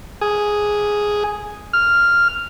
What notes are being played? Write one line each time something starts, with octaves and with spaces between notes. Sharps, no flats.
G#4
F6